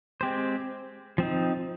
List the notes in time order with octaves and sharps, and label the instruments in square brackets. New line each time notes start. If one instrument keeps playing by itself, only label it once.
[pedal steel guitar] G#3 C4 G4 C5
F3 C4 D#4